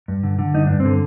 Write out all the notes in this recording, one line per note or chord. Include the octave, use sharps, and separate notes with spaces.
G2
D3
D3
G2 D#4
G2 D4
C4
D3